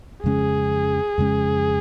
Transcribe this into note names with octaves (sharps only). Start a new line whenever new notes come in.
F2 C#3 G#3 C#4 G#4
F2 C#3 G#3 C#4